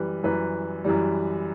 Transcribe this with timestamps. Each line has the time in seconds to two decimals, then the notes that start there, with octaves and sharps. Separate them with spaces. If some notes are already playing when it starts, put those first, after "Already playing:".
Already playing: F#2 E3 G3 B4
0.23 F#2 E3 G3 B4
0.84 F#2 E3 G3